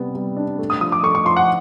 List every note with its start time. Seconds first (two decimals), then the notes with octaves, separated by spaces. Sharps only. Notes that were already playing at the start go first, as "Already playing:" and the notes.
Already playing: C3 G3 B3
0.15 G3
0.37 D4
0.59 A3
0.70 D#6
0.81 F3 D#6
0.92 D6
1.03 A3 C#6
1.15 C#6
1.25 F3 C6
1.37 F#5